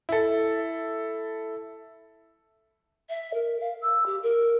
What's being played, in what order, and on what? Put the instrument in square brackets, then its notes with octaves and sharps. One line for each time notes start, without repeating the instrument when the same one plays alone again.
[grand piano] E4 A4
[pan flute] E5
A#4
F5
E6
G4
A#4